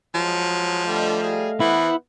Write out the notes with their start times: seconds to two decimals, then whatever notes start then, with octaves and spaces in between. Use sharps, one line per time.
0.15 F3 F#3 G#3
0.85 D3 G3 A3 D#5 F5
1.22 G3 G#4
1.60 E3 B3 E4 C5 F#5